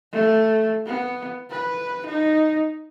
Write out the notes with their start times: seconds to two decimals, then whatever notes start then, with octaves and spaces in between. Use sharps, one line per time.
0.13 A3
0.86 B3
1.50 B4
2.06 D#4